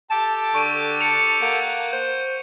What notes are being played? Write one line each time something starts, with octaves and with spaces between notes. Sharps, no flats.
G4 A4 A5 D6
D3 C#6 D7 D#7
A5 C#7 F7
A#3 F#5
C5